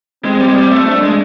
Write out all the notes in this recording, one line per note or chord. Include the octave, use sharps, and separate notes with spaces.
G#3 C4
G3
G#3
G3
A3
A3 D4
G#3